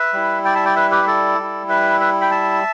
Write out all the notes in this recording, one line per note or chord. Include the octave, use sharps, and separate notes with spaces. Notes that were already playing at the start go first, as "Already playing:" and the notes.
Already playing: B4 E5
G3 E4
D5 G5
E5 A5
D5 G5
B4 E5
G4 B4
E5
A4 D5
G3 E4
B4 E5
B4 E5
G5 B5
E5 A5